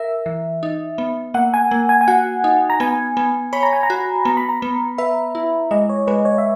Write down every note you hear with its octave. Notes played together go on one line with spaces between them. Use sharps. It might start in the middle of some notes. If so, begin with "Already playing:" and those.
Already playing: A#4 E5
E3
D#4
B3
A#3 F#5
G#5
A#3
G#5
G#5
F#4 F#5
D#4
A#5
B3 G#5
B3
C#5 B5
A#5
G#5
A#5
F#4
B3 A#5
B5
A#5
B3
B4 E5
E4
G#3 D#5
C#5
G#3 B4
C#5
E5